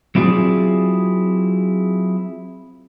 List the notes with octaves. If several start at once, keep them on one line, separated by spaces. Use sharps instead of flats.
F#3 C4 E4 F4 G#4 D5